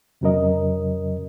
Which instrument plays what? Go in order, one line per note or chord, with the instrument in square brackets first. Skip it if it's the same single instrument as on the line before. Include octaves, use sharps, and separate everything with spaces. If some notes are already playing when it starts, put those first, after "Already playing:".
[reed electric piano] F2 C#3 F#3 C#4 A#4 D#5